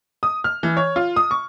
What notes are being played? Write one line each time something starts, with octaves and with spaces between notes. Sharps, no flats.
D#6
F6
E3
C#5
F4
D#6
C#6